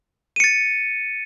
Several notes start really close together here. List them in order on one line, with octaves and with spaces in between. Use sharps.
D#7 C#7 A6